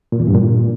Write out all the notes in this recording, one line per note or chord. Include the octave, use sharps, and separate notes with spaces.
A#2
E2
G2
A#2